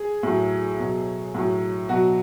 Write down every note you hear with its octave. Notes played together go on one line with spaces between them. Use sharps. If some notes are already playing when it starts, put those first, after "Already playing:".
Already playing: G#4
A2 F#3
B2 F#3
A2 F#3
B2 F#3 F#4